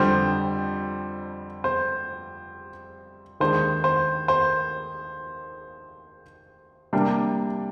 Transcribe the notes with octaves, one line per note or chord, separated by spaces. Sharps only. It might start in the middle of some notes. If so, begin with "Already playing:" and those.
Already playing: F2 D3 G3 C5
C5
D#2 D#3 G#3 D4 C5
C5
C5
C3 G3 A#3 D4